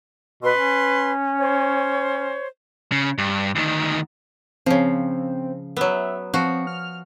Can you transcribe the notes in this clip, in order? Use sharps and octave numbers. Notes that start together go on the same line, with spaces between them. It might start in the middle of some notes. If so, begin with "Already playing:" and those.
B2 B4 C6
C#4
C5 C#5
C#3
G2
D2 D#3
C#3 F3 C4
F#3 B3 E5
F3 C4 F#4
F6